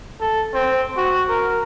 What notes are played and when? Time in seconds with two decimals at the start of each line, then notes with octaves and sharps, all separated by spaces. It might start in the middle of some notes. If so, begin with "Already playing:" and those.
0.21 A4
0.54 C4
0.97 F#4
1.29 A#4